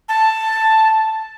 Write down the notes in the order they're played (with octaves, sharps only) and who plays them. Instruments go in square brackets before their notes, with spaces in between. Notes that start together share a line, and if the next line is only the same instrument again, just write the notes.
[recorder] A5